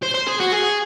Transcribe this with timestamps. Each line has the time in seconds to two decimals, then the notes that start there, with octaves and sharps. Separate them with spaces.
0.03 C5
0.14 C5
0.27 G#4
0.40 F#4
0.52 G#4